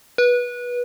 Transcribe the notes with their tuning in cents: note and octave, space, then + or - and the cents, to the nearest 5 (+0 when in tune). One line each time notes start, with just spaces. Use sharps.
B4 -20